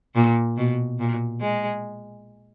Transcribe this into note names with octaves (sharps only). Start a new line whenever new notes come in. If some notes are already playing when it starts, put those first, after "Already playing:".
A#2
B2
A#2
G#3